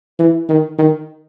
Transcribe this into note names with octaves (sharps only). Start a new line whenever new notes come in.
E3
D#3
D#3